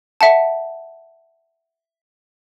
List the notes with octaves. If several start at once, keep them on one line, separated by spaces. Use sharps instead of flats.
E5 F#5 A5